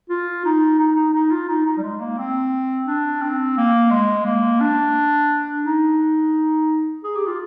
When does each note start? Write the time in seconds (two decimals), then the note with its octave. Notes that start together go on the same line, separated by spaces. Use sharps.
0.10 F4
0.45 D#4
0.79 D#4
0.96 D#4
1.13 D#4
1.31 F4
1.48 D#4
1.66 D#4
1.77 G3
1.83 G#3
2.00 A#3
2.18 C4
2.87 D4
3.22 C4
3.57 A#3
3.91 G#3
4.26 A#3
4.60 D4
5.65 D#4
7.04 G#4
7.16 G4
7.27 F4